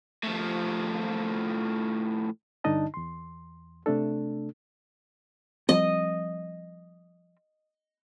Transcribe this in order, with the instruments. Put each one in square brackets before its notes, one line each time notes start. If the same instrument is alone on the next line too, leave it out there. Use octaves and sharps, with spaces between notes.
[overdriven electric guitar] A2 F3
[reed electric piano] G2 D3 D4 D#4 D#5 A5
E2 C6
C3 A3 D4 A4
[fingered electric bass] F3 G3 C4 [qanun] D#5